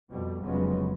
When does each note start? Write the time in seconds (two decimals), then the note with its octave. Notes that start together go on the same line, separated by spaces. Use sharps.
0.11 F2 B2 G3
0.44 F1 C#3 F#3 G#3 B3 C#4